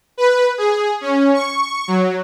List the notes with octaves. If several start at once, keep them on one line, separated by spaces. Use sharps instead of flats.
B4
G#4
C#4
C#6
F#3